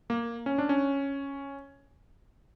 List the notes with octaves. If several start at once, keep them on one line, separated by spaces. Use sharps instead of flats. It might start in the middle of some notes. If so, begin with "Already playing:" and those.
A#3
C#4
D4
C#4